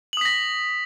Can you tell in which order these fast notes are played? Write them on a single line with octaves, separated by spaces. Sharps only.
F#7 D#6 B6 A#6